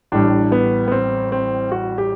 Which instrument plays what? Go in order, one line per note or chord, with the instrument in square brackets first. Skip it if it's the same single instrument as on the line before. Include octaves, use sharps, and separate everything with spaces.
[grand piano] A1 A2 G3 D4
B3
B3
C4
C4
F#4
G4